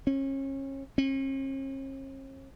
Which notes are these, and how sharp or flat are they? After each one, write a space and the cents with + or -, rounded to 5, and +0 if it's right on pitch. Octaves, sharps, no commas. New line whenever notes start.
C#4 -30
C#4 -45